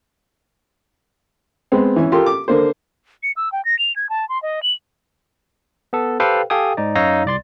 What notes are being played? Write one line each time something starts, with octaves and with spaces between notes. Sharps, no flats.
G#3 B3 C4
E3 C#4
F4 G4 A4 A#4 C6
D6
D3 A#3 C5
C#7
E6
G5
A#6
F7
G#6
A5
C6
D#5
F#7
B3 A4
G4 A4 B4 C5 F5 G5
G4 A4 F5 G5 G#5 D#6
G#2 D#4 D5
F#2 D#4 C#5 F5 E6 A#6
C2 D5 C6 A6